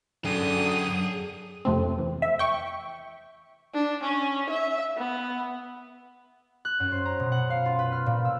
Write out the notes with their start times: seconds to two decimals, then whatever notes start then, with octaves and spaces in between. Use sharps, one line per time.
0.25 F#2 D3 G#4 G5 D#6
1.65 F2 C3 A3 C4
1.98 E2
2.22 E5
2.39 G5 C#6
3.74 D4
4.03 C#4
4.50 E5
4.97 B3
6.65 F#6
6.80 F#2
6.92 C5
7.05 A#5
7.20 B2
7.32 F#5
7.50 F5
7.66 F4
7.79 B4
7.92 F6
8.06 A#2
8.25 E6